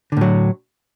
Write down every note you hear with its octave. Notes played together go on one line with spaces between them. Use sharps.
A2 D3 F#3